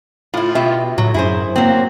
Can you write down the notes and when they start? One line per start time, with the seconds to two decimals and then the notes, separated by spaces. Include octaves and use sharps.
0.34 A2 E4 F4
0.55 B2 G4 E5
0.98 A2 F#3
1.14 F#2 E4 G#4 C5
1.56 F#3 A#3 C4